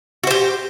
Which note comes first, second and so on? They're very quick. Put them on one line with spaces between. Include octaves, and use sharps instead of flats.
F#4 C5 G4